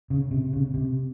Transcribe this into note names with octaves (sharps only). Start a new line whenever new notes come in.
C#3
C3
C#3
C3